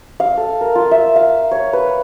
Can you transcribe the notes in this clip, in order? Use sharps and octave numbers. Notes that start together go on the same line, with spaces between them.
F5
A4
A#4
F4
E5
F5
C#5
B4